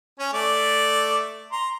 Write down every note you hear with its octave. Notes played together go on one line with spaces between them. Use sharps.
C#4 G#5
A3 D5
A#5 C6